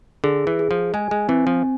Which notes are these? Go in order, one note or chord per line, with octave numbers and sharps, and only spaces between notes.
D3 G#4
E3
G#4
F3
G#3 G#5
G#3
E3 C4
F3